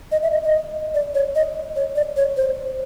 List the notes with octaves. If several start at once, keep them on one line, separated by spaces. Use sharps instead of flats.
D#5
E5
D#5
D#5
D5
C#5
D#5
C#5
D5
C#5
C5